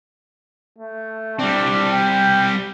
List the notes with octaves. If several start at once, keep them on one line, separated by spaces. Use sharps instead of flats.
A3
G3 C4 D4
G5